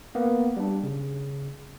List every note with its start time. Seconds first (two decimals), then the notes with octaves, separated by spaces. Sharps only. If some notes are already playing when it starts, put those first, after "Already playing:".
0.15 A#3 B3
0.57 G3 D4
0.84 C#3